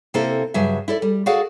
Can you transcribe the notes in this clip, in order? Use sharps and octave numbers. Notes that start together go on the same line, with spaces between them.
C3 A#3 C4 E4 A4
G2 C#3 F#3 E5
E4 A4 D5
G3
F#4 G#4 A4 D5 F5 F#5